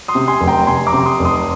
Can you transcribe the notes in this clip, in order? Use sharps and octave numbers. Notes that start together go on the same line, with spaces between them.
C6 D#6
C3
G#5 C6
F1
G5 A#5
C3 G#5 C6
A#5 D6
C3
C6 D#6
F1
C6 D#6